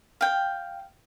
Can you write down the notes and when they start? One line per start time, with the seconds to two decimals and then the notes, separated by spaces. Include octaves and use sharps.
0.21 F5 G5